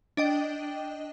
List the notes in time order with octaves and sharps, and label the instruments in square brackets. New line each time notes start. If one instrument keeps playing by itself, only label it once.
[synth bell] D4 D#5 G5